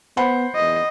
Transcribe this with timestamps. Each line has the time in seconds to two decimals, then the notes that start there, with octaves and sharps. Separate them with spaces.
0.17 B3 C5 F#5 B5
0.55 E2 D#5